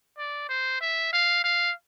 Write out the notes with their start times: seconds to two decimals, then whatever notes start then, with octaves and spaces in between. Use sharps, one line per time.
0.18 D5
0.49 C5
0.81 E5
1.13 F5
1.44 F5